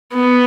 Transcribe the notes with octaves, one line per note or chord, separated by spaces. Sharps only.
B3